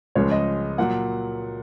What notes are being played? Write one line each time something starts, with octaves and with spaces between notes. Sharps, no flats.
C#2 C#3 F3 G#3 C#5
D#5
A#2 F#3 F#5